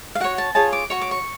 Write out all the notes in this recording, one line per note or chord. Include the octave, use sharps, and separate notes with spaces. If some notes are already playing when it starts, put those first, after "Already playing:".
F5
F#4 C#5 F#5
A5
F4 G#4 C#5 A5
D6
F#4 C#5 C#6
D6
C#6